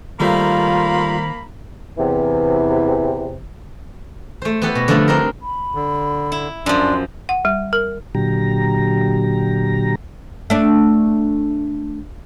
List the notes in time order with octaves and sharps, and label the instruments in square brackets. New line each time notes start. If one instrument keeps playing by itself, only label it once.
[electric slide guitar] D#3 C5 [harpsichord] G3 A3 [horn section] A#3 A#5 B5 [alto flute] F4
[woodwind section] E2 C3 E3
[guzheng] A3 C5
B3 E4 G4 A4 B4
B2
D3 F3 G3 A3 D4
C4 D4 D#4 A#4
[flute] B5
[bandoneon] D3
[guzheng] E4
[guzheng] F#2 F3 [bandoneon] D4 [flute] C6
[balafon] F#5
G3
A#4
[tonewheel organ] A#2 D3 F#3 G4 A#5
[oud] A3 D4